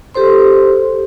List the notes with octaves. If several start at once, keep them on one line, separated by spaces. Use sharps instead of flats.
G4 A4 C5 C6